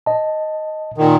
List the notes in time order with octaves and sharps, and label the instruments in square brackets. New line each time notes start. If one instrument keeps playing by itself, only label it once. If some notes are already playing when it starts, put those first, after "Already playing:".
[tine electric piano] D#5 A5
[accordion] A#2 D#3